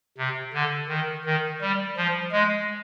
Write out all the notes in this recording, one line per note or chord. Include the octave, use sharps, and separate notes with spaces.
C3
D3
D#3
D#3
G3
F3
G#3